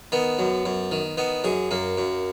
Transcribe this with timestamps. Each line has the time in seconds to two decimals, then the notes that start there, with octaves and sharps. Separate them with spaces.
0.12 D#3 B3
0.39 F#2
0.65 F#2
0.91 D#3
1.17 D#3 B3
1.44 F#2 G#4
1.71 F#2 A#3
1.98 F#2